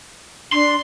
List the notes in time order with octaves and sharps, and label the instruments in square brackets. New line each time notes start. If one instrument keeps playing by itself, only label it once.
[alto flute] D4 [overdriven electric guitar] C6